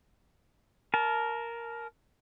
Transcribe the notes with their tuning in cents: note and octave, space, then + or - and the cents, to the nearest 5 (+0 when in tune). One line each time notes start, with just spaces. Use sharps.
A#4 +0 A5 -30